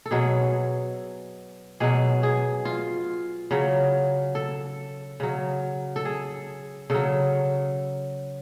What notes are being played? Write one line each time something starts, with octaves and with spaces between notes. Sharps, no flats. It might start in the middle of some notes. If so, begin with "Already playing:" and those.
A4
B2 F#3 G#4
B2 F#3 G#4
G#4
F4
C#3 F#3
A4
C#3 F#3
A4
G#4
C#3 F#3 A4